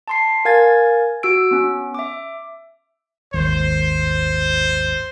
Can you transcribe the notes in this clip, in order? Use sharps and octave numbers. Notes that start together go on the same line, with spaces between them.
A5 C6 C7
A#4 F5 G#5 G#6 A6
F#4 E6 D7
B3 C#4
E5 D6
G#1 D#2 C5